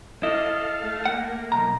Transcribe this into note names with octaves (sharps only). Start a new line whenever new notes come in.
E4 A4 D#5 F5
A3
A#3 F#5
B1 A#2 A#5